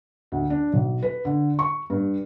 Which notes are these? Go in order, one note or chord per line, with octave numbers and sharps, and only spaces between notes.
D2
D4
B1
B4
D3
C#6
G2